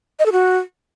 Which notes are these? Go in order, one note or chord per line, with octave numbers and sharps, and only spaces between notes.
D#5
A4
F#4